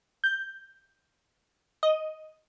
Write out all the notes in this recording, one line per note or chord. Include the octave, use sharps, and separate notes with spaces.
G6
D#5